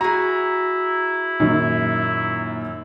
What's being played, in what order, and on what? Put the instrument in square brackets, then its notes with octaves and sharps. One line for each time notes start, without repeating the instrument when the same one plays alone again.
[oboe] E4 [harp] F#4 G#4 [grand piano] A#5
[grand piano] F#2 [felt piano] A#2 D#3 D#4